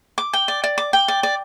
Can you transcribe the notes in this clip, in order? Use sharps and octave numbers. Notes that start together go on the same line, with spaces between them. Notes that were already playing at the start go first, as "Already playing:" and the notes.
D6
G5
D5
D5
D6
G5
D5
D5